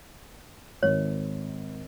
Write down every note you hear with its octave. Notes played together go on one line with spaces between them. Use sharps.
G#1 C#5